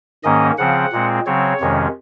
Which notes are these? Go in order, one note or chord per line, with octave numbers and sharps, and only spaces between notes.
G#2 D#3 A#3 C#4 D#5
C#3 F3 C4 F#5
A#2 G#3 C4
C#3 F#3 C4 C#5
F2 C3 D#3 G#3 C#4